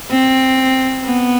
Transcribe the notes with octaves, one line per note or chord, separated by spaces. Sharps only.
C4
B3